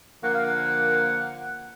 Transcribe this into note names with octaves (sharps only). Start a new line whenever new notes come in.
D3 F3 A#3 F#5
F5
F#5